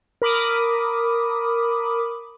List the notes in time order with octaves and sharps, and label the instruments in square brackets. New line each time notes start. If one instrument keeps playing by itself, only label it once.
[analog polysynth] A#4 B5 D6 D#6